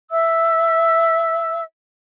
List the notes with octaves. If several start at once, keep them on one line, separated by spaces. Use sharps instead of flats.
E5 E6